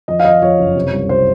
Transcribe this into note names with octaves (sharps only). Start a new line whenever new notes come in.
F2 D#5
F5
F2 D#5
F2 C#5
F#1
C3
C2
C3 C5